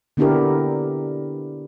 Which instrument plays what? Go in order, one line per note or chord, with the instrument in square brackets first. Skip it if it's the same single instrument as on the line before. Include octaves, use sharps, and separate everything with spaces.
[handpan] D3 B3 D4 E4 G4 A#4